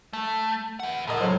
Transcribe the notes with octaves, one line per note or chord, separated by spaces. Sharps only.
A3
E3 F#5
A2 A#4 D#5
C#2 F#3 A4 C5